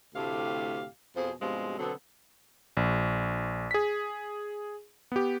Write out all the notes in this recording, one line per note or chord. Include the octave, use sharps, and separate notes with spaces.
D2 A2 C3 A3 G4 F5
F2 B2 F3 G#4 C5
G2 B2 F3 G3 G#3 C4
B2 D3 F#3 B3 C4 A4
A#1
G#4 B6
B3 G4